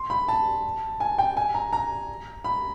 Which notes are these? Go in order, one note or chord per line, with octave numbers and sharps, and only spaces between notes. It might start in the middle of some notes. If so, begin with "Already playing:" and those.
Already playing: C6
B5
A5
G#5
G5
G#5
A#5
A#5
B5